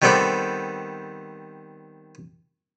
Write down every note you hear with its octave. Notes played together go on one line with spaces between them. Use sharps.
D#3 G3 B3 C4 A4 D5